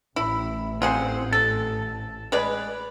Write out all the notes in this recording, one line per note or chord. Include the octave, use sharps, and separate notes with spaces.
A1 E4
C4 F4 G#4 C5 F#5
A4 A5
G#3 B4 D5